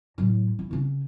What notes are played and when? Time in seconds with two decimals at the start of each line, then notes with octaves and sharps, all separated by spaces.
0.18 A2 F#3
0.59 E4
0.71 C#3 C#4